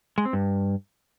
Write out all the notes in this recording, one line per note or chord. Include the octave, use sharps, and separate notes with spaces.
G#3
C4
G2